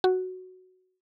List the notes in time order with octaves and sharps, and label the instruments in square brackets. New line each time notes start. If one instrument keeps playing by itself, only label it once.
[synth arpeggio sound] F#4